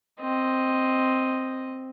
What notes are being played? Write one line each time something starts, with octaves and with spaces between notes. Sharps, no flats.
C4 D#5